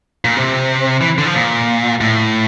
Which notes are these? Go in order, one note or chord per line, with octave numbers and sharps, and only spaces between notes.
A#2
C3
E3
D3
F3
A#2
A2